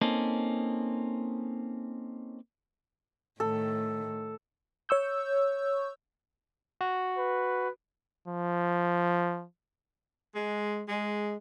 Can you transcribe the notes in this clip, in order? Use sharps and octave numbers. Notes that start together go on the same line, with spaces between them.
A#3 C4 C#4 D#4 A4
A2 D#3 A4
C#5 C#6 E6 G6
F#4
B4
F3
G#3
G#3